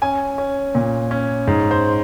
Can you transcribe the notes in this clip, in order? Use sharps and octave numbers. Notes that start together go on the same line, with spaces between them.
C#4 G#5
C#4
A#2
C#4
G#2
C5